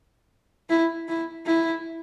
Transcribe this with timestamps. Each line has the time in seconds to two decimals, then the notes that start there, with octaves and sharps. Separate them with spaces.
0.69 E4
1.08 E4
1.46 E4